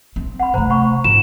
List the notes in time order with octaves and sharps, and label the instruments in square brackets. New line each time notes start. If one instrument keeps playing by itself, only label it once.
[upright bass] C4
[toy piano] F#5 B5
[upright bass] C3 A3 [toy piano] C5 A#5
[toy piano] F#5 B5 C#6
[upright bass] G#2 [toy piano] F4 [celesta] E7